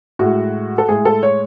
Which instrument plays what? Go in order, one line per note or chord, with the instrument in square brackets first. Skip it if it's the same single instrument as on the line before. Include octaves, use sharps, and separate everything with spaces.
[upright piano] A2 G#3 F#4
A4
A2 G#3 G#4
A4
C#5